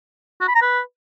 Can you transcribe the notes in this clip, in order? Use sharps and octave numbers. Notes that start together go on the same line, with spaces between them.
F#4
B5
A#5
B4